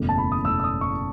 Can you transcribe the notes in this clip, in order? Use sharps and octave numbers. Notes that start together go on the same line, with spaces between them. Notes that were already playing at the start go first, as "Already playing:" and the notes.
Already playing: F#1 E2 B2 A3
A5
B5
D#6
F#1 E2 B2 A3 E6
E6
D#6
C#6